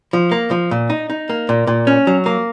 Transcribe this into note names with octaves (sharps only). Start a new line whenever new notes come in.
F3
A#3
F3
A#2
D#4
D#4
A#3
A#2
A#2
C#4
F#3
A#3